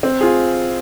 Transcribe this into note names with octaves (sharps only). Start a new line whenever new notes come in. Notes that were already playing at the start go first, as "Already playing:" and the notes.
C4
F4 G#4